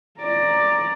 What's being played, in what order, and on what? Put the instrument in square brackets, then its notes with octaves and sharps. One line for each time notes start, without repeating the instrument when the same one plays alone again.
[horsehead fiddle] D5 A#5